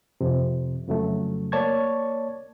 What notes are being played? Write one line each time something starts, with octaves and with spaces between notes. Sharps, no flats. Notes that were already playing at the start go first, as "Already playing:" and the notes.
F2 C3
F2 C#3 F#3 A3
A#3 C#5 D5 A5 C#6 G#6